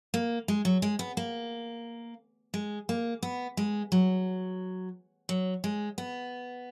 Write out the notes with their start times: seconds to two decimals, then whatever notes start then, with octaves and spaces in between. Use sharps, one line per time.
0.14 A#3
0.48 G#3
0.65 F#3
0.82 G#3
0.99 B3
1.17 A#3
2.54 G#3
2.89 A#3
3.23 B3
3.57 G#3
3.92 F#3
5.29 F#3
5.64 G#3
5.98 B3